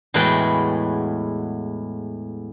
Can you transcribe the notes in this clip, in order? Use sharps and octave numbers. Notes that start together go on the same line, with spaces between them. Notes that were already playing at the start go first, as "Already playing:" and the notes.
E2 A2 G#3 F#4 B4 G5